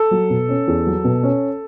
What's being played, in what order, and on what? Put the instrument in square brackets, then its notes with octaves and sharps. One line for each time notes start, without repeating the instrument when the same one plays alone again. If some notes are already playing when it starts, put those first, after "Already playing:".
Already playing: [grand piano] A4
[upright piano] F#3
B2
C#4
E2
F#3
B2
C#4